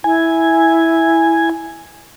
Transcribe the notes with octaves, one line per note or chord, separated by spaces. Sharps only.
E4 G#5